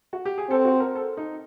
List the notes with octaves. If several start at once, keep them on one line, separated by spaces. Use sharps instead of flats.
F#4
G4
G#4
C4 A4
F#4
A#4
A4
D#4